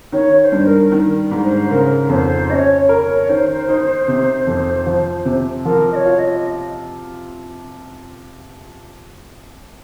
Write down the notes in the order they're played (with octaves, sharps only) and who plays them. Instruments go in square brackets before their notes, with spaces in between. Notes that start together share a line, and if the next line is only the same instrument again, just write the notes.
[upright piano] D#3 [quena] C#5
[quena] C#5
C5
[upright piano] G2
[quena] A#4
[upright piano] D#3
G#2
[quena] C5
[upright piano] C#3 [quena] A#4
[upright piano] F2 [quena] C#5
[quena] C5
[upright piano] C#4 [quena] C#5 D#5
[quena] C#5
[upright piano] A#4
[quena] C#5
[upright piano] D#3 [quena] C5
[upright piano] D#4
C3
F2
F3
C3
[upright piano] F3 [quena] A#4
[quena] D#5
C#5
[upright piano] F4
[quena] D#5